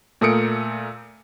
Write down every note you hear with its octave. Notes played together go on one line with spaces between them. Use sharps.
A#2 A3 A#4 D#6 C#7 D7